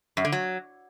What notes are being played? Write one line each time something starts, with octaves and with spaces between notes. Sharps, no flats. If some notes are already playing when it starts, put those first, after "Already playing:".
F#2
D3
F#3